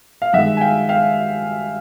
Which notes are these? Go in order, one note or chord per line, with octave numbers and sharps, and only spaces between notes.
F5
G2 D#3 G#3 E5 F#5
G#5
F5 G5
F5 G5